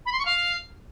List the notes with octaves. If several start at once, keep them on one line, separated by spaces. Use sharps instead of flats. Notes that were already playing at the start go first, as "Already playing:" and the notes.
B5
C6
C#6
F5